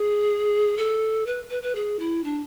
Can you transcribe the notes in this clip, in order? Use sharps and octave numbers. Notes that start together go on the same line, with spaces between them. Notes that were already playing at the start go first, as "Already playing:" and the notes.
Already playing: G#4
A4
B4
B4
B4
G#4
E4
D4